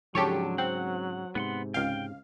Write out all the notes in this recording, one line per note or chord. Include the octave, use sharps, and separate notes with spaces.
G#2 C#3 F3 F#3 D4 G4 A4 C#5
C4 F#5
G#2 C3 B3 F#5 C6
C#2 F5 G5